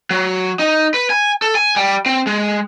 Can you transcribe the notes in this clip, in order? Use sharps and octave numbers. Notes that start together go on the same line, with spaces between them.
F#3
D#4
B4
G#5
A4
G#5
G3
C4
G#3